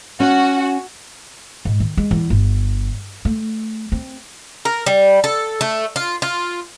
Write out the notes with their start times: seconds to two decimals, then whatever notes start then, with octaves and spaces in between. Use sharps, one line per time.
0.20 C#4 F#4
1.65 G#2
1.80 D#3
1.97 G#3
2.11 E2
2.30 G1
3.25 A3
3.92 C4
4.65 A#4
4.86 G3
5.24 A4
5.61 A3
5.96 F4
6.22 F4